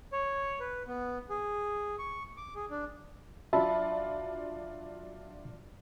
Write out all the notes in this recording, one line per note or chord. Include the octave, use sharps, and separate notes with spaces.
C#5
B4
B3
G#4
C#6
D6
G#4
D4
F#3 D4 F4 E5 A5 B5